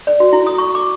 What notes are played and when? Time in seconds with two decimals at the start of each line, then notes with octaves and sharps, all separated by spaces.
0.07 D5
0.20 F#4
0.33 E4
0.47 D#6
0.58 C#6
0.75 D6